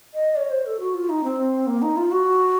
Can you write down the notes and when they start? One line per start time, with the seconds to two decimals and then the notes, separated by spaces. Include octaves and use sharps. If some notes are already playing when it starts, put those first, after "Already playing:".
0.14 D#5
0.36 C#5
0.50 C5
0.66 A4
0.80 F#4
0.94 F4
1.09 D#4
1.24 C4
1.67 A#3
1.82 D#4
1.97 F4
2.12 F#4